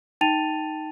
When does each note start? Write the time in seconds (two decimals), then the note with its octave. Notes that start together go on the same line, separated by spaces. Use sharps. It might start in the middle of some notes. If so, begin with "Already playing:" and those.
0.21 D#4 G5 A5 A6 D#7 F7